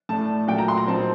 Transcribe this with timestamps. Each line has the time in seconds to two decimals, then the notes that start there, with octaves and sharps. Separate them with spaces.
0.09 A2 A3 D4 A5
0.48 A#2 F#3 A3 G5
0.58 A#5
0.68 C6
0.78 A#5
0.87 A#2 F#3 C4 D#4 A5